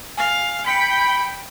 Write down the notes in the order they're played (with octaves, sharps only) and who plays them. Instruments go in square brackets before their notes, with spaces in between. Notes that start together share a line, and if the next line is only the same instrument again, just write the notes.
[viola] F5 [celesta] G#5
[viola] G5 [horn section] B5 [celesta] B6 C#7